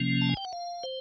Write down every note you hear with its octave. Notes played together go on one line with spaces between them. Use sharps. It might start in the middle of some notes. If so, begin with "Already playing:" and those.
Already playing: C3 F3 A#3 C#4
A5
G#5
G5
F#5
F5
C5